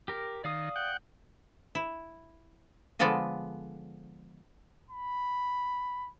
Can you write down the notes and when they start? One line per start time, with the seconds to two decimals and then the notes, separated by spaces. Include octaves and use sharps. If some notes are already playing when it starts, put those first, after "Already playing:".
0.08 G4 A#4
0.44 D#3 D5 F5 D#6
0.76 F#5 G5
1.75 E4
2.99 D3 F3 G#3 B3 A4 D5
4.90 B5